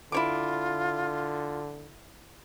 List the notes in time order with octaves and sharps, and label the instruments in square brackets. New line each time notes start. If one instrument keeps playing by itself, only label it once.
[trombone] D3 [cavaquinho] E4 C#5 D6 [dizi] F4